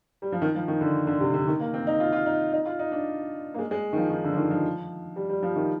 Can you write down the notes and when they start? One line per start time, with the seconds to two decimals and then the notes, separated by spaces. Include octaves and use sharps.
0.22 G3
0.32 F3
0.42 D#3
0.55 F3
0.68 D#3
0.81 D3
1.07 D3
1.20 C3
1.34 D3
1.47 D#3
1.60 A#3
1.74 C4
1.87 D#4
2.00 F4
2.13 F4
2.26 D#4
2.53 D#4
2.66 F4
2.79 D#4
2.92 D4
3.54 A#3
3.59 G#3
3.71 G#3
3.93 D#3
3.97 F3
4.10 D#3
4.24 D3
4.33 F3
4.37 D#3
4.50 F3
5.16 G3
5.29 G3
5.43 F3
5.56 D#3